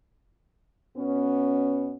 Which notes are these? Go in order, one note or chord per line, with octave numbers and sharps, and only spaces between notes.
B2 B3 C#4